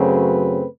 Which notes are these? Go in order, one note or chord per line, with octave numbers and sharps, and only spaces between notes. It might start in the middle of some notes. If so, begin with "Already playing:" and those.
Already playing: F#2 C#3 F#3 A3 C4 B4